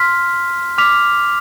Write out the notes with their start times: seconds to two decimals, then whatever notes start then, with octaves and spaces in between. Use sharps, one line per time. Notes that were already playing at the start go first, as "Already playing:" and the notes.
Already playing: C6 F6 B6
0.78 D6 F6 B6 F7